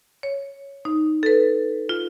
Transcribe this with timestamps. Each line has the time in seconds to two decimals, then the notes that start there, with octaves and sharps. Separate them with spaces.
0.23 C#5
0.85 D#4
1.23 A4 B4
1.89 F4